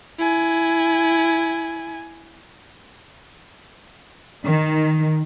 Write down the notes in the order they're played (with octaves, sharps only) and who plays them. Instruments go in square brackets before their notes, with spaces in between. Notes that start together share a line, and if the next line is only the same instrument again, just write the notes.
[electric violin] E4 G#5
[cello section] D#3